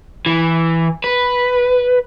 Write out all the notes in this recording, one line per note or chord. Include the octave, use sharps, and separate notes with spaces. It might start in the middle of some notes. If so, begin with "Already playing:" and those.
E3
B4